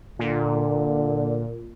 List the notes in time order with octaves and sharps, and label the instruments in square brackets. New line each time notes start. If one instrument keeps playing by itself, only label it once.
[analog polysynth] A#2 [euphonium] D3